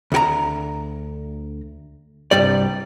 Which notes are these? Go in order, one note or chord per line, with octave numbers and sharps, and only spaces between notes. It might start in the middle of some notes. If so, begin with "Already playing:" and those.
D2 F#4 A#5
C2 G2 G3 D5